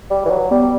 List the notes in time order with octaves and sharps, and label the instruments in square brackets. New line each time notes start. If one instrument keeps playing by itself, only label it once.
[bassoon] G3
E3
F#3
[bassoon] G3 [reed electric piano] B3